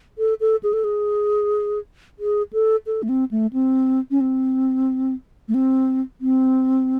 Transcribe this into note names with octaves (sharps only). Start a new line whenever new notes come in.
A4
A4
G#4
A4
G#4
G#4
A4
A4
A3
C4
A3
C4
C#4
C4
A3
C4
C4